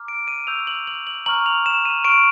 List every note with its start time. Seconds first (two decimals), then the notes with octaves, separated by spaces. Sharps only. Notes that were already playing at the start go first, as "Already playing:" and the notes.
Already playing: A#5 D6 F6
0.08 D7
0.28 D#7
0.47 C#6 E6 G6 F7
0.67 F#7
0.87 F#7
1.07 F#7
1.26 A#5 C#6 F6 F#7
1.46 F7
1.66 E7
1.85 D#7
2.05 C#6 F6 D7